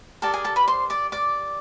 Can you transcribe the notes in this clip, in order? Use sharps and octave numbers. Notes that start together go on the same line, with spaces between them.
G4 A4 A#4 D5 A5
G#4 G#5
A4 A5
B4 B5
C5 C6
D5 D6
D5 D6